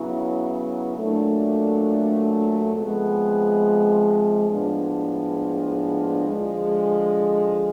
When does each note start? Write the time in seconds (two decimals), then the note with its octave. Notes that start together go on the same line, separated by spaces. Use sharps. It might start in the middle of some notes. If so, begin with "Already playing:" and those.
Already playing: C#3 F#3 B3 E4
0.95 A#2 F#3 A3 D4
2.73 C3 F3 G#3 B3
4.50 A2 F3 G#3 B3 D4
6.28 D3 F3 G#3